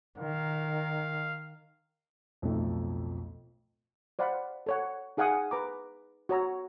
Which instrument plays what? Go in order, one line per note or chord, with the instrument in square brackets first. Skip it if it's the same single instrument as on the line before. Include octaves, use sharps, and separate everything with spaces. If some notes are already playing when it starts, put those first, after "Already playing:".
[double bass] D#3 [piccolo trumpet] F5
[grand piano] B1 F2 A2 A3 D#4
[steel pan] C5 D5 F5 F#5 B5
A4 C#5 F#5
D#4 G#4 F5 F#5 G#5 D#6
B4 A#5 D6
F#4 C#5 A#5 E6